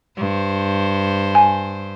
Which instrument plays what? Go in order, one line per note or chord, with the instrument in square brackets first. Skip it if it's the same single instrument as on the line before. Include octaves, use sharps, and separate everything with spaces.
[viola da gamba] G2 C5
[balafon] G#5